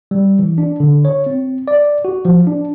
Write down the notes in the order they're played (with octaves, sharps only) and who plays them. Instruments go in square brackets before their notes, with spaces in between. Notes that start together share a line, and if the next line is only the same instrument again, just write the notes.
[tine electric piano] G3
E3
D4
D3
C#5
C4
D5
F#4
F3
D4